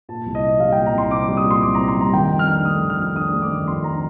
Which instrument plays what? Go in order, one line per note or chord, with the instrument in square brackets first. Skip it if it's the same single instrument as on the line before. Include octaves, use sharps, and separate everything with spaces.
[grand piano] A#2 A5
C2
D#5
C4
G3 F5
G5
A#2
A#5
C2 C6
C4 D6
G3
D#6
A#2
C6
C2 D6
A#5
C4
C6
G3 A#5
D#3 G5
F2
F6
D4
A3 D#6
D#3
F6
F2
D4 D#6
A3
D6
D#3
F2 C6
D4 A#5